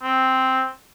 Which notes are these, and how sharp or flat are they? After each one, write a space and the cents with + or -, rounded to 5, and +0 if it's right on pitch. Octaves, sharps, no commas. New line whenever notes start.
C4 +0